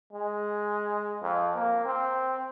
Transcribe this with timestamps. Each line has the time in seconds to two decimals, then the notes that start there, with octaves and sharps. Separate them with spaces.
0.13 G#3
1.22 F2
1.55 A#3
1.86 C4